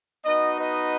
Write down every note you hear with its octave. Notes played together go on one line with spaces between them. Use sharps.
B3 D#4 F#4 B4 D#5
B4 D#5